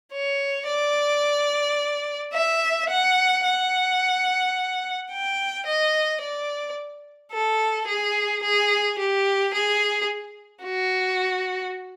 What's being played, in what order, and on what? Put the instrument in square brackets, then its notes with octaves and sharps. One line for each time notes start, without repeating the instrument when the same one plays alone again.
[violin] C#5
D5
E5
F#5
F#5
G5
D#5
D5
A4
G#4
G#4
G4
G#4
F#4